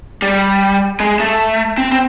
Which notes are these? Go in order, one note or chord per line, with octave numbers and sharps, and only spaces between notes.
G3
G#3
A3
C4
C4